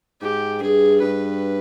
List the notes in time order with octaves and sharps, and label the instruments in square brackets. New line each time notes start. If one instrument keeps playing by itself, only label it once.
[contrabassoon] G#2 [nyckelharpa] G4
[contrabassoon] G2 [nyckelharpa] G#4
[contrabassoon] G2 [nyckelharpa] B4